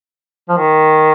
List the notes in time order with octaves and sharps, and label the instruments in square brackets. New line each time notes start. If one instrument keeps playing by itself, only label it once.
[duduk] F3
D#3